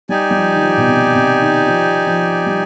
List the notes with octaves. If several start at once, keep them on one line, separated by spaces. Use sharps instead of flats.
G3 D#4 G4 D5 G#5
G3
F3
D#3
F3
B2
C3
C3
D#3
F3
F3
G3